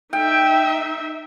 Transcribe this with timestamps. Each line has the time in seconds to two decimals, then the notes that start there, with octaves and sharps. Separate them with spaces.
0.13 D#4 E5 G5